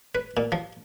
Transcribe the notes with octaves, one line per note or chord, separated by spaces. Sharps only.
B4
A#2
F3